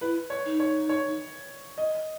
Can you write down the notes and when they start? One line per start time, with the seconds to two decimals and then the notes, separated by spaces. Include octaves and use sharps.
0.01 E4 B4
0.30 C#5
0.45 D#4
0.60 C#5
0.89 C#5
1.78 D#5